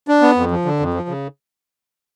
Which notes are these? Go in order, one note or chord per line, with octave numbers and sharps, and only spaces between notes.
D4
B3
F2
F3
D3
F2
F3
C#3